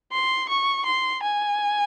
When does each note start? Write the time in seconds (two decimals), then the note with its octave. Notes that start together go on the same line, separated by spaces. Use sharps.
0.12 C6
0.49 C#6
0.86 C6
1.23 G#5